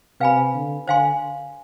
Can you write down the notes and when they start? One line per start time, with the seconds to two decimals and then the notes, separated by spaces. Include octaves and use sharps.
0.20 C3 B4 F5 G#5 B5
0.54 D3
0.88 D3 C5 F5 G#5 C6